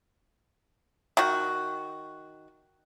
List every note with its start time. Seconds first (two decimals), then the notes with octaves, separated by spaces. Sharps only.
1.17 D#3 F#4